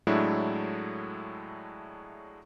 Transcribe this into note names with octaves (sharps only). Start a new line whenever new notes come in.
A2 F#3 G#3 A3 D4 E4